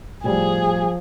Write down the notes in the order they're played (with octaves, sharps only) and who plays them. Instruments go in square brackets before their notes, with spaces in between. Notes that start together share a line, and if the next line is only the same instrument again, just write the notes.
[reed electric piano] A2 G3 [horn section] F3 [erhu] G#4